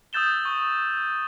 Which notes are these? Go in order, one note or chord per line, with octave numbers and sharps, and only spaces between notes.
D#6 E6 G6 A6 E7 G7
C#6